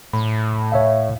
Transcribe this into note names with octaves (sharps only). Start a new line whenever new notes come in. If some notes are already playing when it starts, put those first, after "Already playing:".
A2 B5
C#5 E5 F5